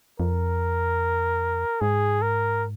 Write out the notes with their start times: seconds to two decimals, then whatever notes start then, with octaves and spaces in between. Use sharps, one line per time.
0.19 F2 A#4
1.81 G#2 G#4
2.22 A#4